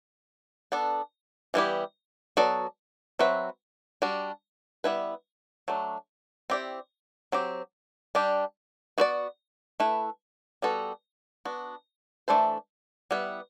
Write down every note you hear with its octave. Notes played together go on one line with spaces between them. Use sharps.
B3 D4 A4
E3 G3 B3 E4 G4
F#3 B3 F#4 A4 D5
F#3 C4 F#4 B4 E5
G3 D4 F#4
G3 B3 E4 B4
F#3 A3 D4
C4 E4 G4 D5
F#3 C4 G4
G3 D4 G4
B3 F#4 B4 D5
A3 E4 B4
G3 B3 F#4 A4
B3 D4 F#4
E3 A3 D4 A4 C5
G3 B3 E4 B4